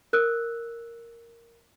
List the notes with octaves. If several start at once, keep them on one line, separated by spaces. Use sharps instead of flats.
A#4 E6 F#6